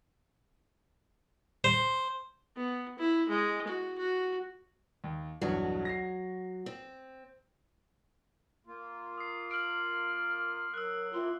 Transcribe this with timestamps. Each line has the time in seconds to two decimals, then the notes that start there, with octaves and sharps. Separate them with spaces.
1.64 C5
2.57 B3
2.99 E4
3.29 G#3
3.67 F#4
3.98 F#4
5.04 D#2
5.42 B1 E2 G2 F#3 F#4
5.85 A#6 C7
6.66 C4
8.67 A#3 F4
9.18 D#6 C7
9.51 F6 D7 F#7
10.74 F#3 A#4 E6 F#6
11.14 A#3 C4 E4 F4 C6